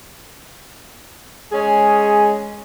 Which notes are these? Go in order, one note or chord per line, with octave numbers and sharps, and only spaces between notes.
G#3 C#4 G#4